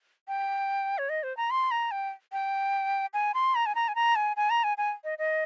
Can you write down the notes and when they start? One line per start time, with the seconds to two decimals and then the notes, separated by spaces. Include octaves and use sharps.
0.28 G5
0.98 C#5
1.09 D#5
1.23 C5
1.37 A#5
1.51 C6
1.71 A#5
1.91 G5
2.32 G5
3.14 G#5
3.34 C6
3.55 A#5
3.66 G#5
3.75 A#5
3.88 G#5
3.95 A#5
4.16 G#5
4.37 G#5
4.50 A#5
4.64 G#5
4.78 G#5
5.04 D#5
5.18 D#5